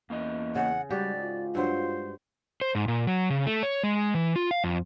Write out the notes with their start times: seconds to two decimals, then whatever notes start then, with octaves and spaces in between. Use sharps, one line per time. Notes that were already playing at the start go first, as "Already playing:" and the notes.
0.10 E2 A#3 C#4 D#5
0.55 C#3 F#5
0.90 G#2 G3 F#4 G4 D5
1.21 F4
1.55 G2 F#3 C5
2.61 C5
2.75 G#2
2.88 A#2
3.07 F#3
3.30 C#3
3.46 A3
3.63 C#5
3.84 G#3
4.15 E3
4.36 F4
4.51 F5
4.64 F2